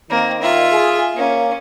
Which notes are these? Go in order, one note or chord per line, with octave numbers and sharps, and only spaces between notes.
D#3 A#3 C4
F4 E5
G#4
A#3 C#4